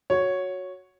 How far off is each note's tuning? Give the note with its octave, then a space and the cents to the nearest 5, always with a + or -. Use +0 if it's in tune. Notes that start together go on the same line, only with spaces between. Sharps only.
F#4 -10 C#5 +0